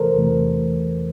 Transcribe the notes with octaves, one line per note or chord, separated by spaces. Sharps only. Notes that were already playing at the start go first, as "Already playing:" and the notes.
Already playing: E2 C3 E3 A3 A4 A#4 C5
E2 C3 E3 A3